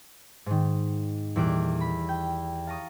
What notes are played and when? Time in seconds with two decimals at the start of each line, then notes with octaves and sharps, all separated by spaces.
0.46 G#2 D#3
1.36 E2 A#2 G3 A4 D6 F#6
1.80 B5
2.09 G5
2.67 F5 A5 A#5 C#6 D#6